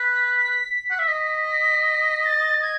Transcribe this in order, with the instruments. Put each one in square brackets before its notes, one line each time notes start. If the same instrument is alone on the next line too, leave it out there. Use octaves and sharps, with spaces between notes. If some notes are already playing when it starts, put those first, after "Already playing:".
Already playing: [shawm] B4 [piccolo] B6
[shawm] F#5
E5
D#5
[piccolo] B6
A6
G#6